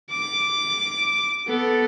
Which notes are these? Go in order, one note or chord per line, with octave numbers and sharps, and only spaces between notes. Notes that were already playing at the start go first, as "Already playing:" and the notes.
D6
B3 A4